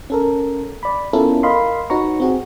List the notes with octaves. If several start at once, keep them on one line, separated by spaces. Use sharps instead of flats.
C#4 A4 A#4
D5 B5
B3 C#4 E4 F4 A4 A#4
A#4 D#5 F5 B5 C6
D#4 F#4 B4 C#5 A#5 C#6
C4 F#4 G#4